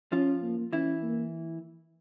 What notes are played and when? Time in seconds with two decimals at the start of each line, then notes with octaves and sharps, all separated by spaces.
0.12 F3 C#4 F4
0.42 A#3
0.73 E3 C#4 E4
1.03 A#3